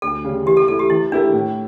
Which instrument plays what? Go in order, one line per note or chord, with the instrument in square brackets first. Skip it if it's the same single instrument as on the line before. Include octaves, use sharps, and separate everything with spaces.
[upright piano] D2 [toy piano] A4
[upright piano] C#3 G3
[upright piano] E3 [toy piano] G4
[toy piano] A4
[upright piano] A3 E4 [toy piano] A4
[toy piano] G4
[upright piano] E3 [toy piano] E4
[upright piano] A3 E4 G4 A#4 [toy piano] D4
[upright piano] A2